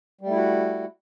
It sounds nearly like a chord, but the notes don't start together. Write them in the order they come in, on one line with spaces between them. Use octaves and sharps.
G3 A3 E4 F#4